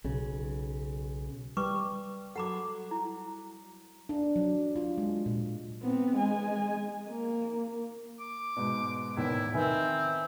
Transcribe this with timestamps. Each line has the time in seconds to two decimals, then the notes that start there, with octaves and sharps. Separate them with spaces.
0.04 B1 C#3
1.57 G3 B4 C#6 D6
2.36 F#3 A4 F#5 B5 D6
2.91 E4
4.09 D4
4.36 F#3
4.76 F4
4.98 G#3
5.26 A#2
5.83 B3 C4
6.18 G#3 G#5
7.08 A#3
8.20 D6
8.57 G#2 B2
9.17 E2 A2 D#3 E4
9.54 D#3 C4 B4 E5 G#5